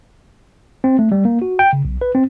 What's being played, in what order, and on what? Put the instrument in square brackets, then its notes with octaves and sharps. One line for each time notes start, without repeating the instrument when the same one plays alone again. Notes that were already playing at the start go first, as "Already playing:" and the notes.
[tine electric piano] C4
A3
G3
A#3
F#4
G5
C#3
B1
B4
C4